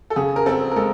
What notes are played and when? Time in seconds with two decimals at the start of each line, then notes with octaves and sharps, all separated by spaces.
0.10 A4
0.16 C#3 G#4
0.36 A#4
0.46 C4 A4
0.71 A#4
0.76 G#3 A4